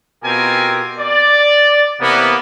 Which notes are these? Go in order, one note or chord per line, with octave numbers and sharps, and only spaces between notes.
B2 C4 F4 G4 A#4 G#5
D5
C3 E3 A#3 B3